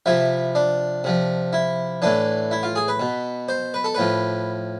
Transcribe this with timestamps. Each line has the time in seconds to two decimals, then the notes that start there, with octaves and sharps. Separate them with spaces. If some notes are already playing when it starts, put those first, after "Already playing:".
0.06 C3 F3 E4
0.55 D4
1.04 C3 F3
1.53 E4
2.02 A2 E3 D4
2.51 E4
2.63 F4
2.76 G#4
2.88 B4
3.00 B2
3.49 C5
3.74 B4
3.84 A4
3.95 A2 F3 B4